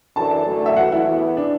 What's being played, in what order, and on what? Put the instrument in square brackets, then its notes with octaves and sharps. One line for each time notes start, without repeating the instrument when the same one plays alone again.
[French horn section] F#2 E3 D4 A4 [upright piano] A5
[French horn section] F#2 D3 F#3 A3
[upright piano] E5
[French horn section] E3 A3 F#4 [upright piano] F#5
[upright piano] E4
[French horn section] E2 E3 B3
[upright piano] D4